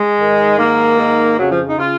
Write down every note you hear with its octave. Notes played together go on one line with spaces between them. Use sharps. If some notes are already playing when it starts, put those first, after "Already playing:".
Already playing: G#3
G#2 D#3
G#2 D#3 A#3
G#2 D#3
F2 C#3 F#3
F3
D#4
C#3 F4